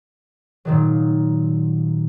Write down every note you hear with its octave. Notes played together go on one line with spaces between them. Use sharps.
A#2 D#3 F#3